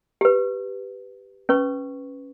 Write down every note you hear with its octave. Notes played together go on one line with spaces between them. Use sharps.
G4 B4
C#4 B4 C#6